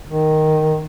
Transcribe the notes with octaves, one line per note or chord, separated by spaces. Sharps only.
D#3